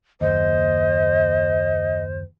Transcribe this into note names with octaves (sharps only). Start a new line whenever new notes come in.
F#1 D#2 C5 D#5